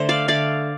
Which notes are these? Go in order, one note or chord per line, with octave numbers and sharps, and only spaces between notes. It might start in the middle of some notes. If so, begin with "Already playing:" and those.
Already playing: D3 A3 C5
D5 F5
D3 A3 D5 F5